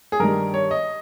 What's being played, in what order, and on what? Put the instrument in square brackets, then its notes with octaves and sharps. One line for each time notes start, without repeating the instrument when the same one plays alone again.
[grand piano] G#4
G2 D#3 G3 A#4
C#5
D#5